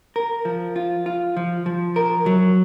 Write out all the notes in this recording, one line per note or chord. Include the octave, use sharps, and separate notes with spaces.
A#4
F3
F4
F4
F3
F3
A#4
F#3